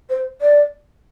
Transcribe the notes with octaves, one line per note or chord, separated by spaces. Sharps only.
C5
D5